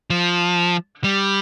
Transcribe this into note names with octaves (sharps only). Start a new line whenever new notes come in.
F3
G3